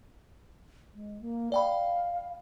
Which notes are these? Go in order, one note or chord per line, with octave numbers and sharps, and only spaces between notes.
G#3
A#3
D5 F5 G5 B5